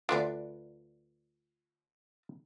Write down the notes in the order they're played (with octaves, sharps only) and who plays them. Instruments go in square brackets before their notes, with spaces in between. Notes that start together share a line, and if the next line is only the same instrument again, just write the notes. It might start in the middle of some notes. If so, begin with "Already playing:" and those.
[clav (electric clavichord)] D2 D4 [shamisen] F4 B4 D5